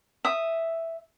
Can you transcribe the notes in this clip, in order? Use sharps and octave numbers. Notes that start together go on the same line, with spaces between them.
E5 D#6